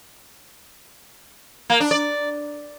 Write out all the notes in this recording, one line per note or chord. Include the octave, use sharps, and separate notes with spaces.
A#3
D4
D5